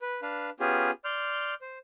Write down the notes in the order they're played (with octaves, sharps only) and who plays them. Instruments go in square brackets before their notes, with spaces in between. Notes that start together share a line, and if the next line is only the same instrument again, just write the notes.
[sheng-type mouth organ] B4
D4 B4 F5
B3 C#4 F4 G4 G#4
D5 C6 F6 G6
C5